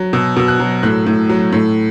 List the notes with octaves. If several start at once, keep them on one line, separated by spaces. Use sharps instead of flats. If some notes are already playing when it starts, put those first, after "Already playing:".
Already playing: F#3
B2 E6
B2 E6
F#6
F#3
A2 F#6
A2
F#3
A2